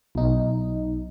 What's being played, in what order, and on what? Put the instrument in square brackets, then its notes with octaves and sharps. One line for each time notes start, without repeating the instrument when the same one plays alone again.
[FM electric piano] B1 D#4